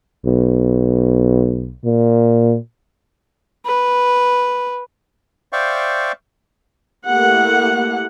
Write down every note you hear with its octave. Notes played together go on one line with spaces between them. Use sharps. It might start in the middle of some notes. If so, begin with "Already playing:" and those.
B1
A#2
B4
C5 D5 E5 F5 G5 C#6
A3 A#3 E4 G4 F#5